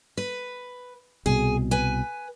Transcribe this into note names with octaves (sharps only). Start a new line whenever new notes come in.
B4
C2 B2 G#4
B4 G#5